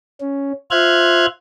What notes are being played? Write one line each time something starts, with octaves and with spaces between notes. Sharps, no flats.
C#4
F4 C5 E5 F6 F#6 G#6